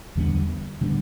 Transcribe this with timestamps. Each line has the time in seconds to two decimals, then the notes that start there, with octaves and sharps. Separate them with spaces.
0.15 E2 D3 G3 B3
0.81 D3 G3 B3